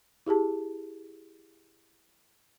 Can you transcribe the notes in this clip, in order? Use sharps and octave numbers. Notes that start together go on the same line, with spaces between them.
E4 G4 G#4 A5